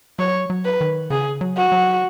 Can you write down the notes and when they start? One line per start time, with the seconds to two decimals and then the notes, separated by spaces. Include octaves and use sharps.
0.19 F#3 C#5
0.50 F#3
0.65 B4
0.81 D#3
1.10 C#3 G#4
1.41 F#3
1.57 F#4
1.72 F#3